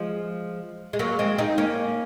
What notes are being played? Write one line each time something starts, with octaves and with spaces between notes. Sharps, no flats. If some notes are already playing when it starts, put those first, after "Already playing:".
Already playing: F3 G#3
G#3
F#3 A#3
G#3 C4
C4 D#4
A#3 C#4